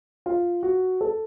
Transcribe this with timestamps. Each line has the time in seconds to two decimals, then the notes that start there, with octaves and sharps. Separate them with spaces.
0.26 F4
0.63 F#4
1.01 A4